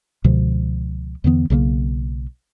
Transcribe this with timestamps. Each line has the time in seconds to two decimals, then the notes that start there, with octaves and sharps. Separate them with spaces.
0.24 C#2 B2 D3 F3
1.24 E2 D3 E3 B3
1.50 B1 C#3 G3 A#3